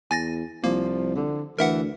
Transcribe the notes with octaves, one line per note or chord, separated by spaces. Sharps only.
E2 G#5 A6 A#6
C2 F3 A#3
D3
D2 E3 A#4 E5 F#5